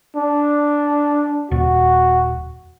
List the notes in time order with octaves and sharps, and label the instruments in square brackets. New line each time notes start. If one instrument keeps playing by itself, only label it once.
[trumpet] D4
[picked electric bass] D#1 [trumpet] F#4